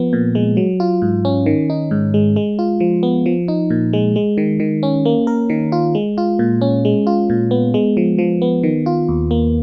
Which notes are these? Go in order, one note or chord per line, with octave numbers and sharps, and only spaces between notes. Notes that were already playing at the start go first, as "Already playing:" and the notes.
Already playing: F3 B3
A#2
G#3
F#3
F4
G#2
C#4
D#3
D#4
G#2
G#3
G#3
F4
F3
B3
F3
D#4
A#2
G#3
G#3
D#3
D#3
C#4
A#3
A#4
D#3
F4
G#3
F4
A#2
C#4
G#3
F4
A#2
B3
G#3
F3
F3
B3
D#3
F4
D#2
A#3